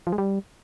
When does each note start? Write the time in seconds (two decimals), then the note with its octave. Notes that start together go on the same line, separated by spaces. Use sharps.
0.07 F3
0.13 G#3
0.18 G3